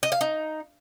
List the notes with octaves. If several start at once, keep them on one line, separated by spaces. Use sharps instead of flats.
D#5
F5
D#4